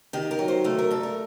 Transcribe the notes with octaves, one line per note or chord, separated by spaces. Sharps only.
D#3 G4
A#4
F#3
C5
A3 A#4
A#4
G2 A4
A#4